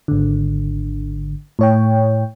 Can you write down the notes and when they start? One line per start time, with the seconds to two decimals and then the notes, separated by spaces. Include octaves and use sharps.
0.08 G#1 D3
1.59 A2 C#5 G5